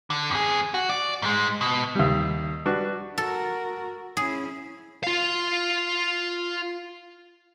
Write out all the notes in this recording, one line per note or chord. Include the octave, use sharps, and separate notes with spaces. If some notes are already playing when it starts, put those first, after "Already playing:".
D3
F2 G#4
F#4
D5
G#2 G#3
B2
D#2 G3
G3 D4 F#4 B4
F#4 A4 A#4
C#4 E4 G#4
F4 F5